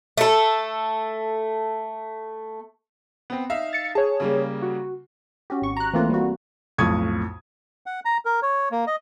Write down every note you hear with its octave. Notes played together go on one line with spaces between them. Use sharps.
A3 A4
B3 C4
D#4 E5 F5
A6 C#7
G#4 C#5 A5
C#3 G3 A#3
F#4
C#4 F#4 G4
G#1 C#6
A#5 F#6
E3 A3 A#3 C4 F4
G3 F#4
B1 F2 A2 C#6 D#6 G#6
F#5
A#5
A#4
C#5
A#3
D#5